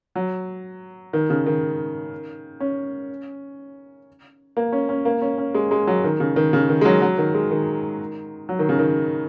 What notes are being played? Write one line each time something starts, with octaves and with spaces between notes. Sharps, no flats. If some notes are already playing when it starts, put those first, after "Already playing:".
F#3
D#3
C#3
D#3
C#4
A#3
C#4
C#4
A#3
C#4
C#4
G#3
G#3
F#3
D#3
C#3
D#3
C#3
D#3
G#3
F#3
F#3
D#3
G#3
D#3
F#3
D#3
C#3
D#3